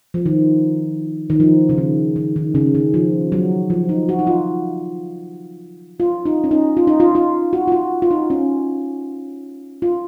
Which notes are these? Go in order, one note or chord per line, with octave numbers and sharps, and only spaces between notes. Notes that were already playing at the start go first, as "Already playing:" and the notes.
F3
D#3
D#3
F3
C#3
D#3
D#3
D#3
C#3
D#3
F3
F#3
F3
D#4
F#4
D#4
F4
F4
D#4
C#4
D#4
F4
D#4
F4
F4
F#4
F4
F#4
F4
D#4
C#4
F4